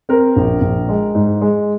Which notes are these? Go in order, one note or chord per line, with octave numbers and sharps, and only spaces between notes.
C4 A#4
A#1
A#1
G#3
G#2
G#3